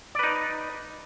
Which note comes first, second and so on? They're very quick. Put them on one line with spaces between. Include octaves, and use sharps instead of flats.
D5 B4 D#4